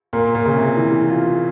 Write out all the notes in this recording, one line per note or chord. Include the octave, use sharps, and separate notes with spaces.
A#2 A#3
A#2
C#3
C3
E3
F4